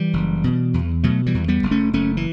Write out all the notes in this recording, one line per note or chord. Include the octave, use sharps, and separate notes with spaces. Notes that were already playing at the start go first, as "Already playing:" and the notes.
Already playing: E3 G3
F#1
B2
E2
B2 F#3 A3
E3 G3
E2
G3 B3
F#1
A3 C#4
F#1 A3 C#4
E3